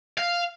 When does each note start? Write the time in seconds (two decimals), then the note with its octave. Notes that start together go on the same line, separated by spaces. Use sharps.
0.18 F5